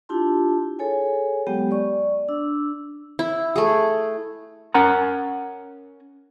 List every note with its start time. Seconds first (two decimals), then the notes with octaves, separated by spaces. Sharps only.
0.09 D4 E4 F4 G4 A5 C6
0.79 G#4 A4 C#5 G#5
1.47 F#3 G#3 B3 G4 G5
1.71 D5 C#6
2.28 D4 E6
3.19 E4
3.56 A3 G#4
4.74 C#4 A#4 F#5 G#5 A#5